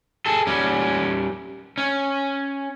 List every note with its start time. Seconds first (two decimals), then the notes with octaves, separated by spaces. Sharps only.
0.26 G#4 A4
0.47 G3 C#4
1.78 C#4